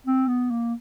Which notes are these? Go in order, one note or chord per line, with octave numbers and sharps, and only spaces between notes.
C4
B3
A#3